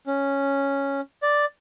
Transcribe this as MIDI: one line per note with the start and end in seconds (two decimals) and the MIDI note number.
0.07 1.01 61
1.22 1.45 74